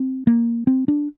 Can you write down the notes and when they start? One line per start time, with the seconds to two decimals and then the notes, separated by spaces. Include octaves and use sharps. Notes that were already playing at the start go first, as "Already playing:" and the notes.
Already playing: C4
0.27 A#3
0.67 C4
0.88 D4